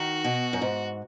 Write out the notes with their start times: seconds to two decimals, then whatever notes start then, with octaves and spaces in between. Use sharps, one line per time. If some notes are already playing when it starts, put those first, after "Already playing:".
Already playing: D#3 F#4
0.24 B2
0.53 F#2
0.62 G#2